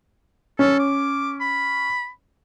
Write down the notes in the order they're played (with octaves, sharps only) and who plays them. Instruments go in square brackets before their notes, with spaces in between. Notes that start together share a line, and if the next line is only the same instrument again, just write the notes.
[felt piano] C#4 [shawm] A4
[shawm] D6
B5